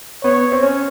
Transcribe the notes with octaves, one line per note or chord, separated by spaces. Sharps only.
B3 C#5
C4
C#4